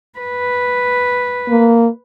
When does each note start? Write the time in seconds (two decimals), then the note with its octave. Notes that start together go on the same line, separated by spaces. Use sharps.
0.19 B4
1.48 A#3